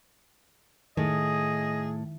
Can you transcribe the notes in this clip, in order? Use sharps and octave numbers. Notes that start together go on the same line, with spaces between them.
A2 D#3 G#4 D#5